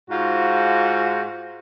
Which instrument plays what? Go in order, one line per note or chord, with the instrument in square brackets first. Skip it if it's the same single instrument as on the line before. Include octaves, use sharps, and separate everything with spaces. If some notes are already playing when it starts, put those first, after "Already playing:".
[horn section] G#2 F4 F#4